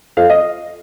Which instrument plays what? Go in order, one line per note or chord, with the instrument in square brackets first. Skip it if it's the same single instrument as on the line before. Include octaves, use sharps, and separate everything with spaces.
[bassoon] F2 [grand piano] F5
[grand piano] D#5